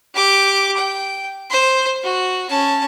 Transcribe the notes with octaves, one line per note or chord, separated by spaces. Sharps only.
G4 D6
G5
C5
F#4
C#4 A5